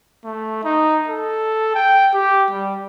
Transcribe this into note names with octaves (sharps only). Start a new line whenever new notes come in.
A3
D#4
A4
G5
G4
G3